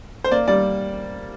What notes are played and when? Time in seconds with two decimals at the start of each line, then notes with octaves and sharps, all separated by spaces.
0.24 C5
0.32 A#3 D5
0.48 G3 D5